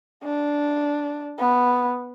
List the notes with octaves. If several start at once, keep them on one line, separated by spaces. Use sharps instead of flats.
D4
B3